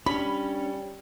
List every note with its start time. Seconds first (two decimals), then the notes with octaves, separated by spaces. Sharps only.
0.06 G3 C#4 D4 B5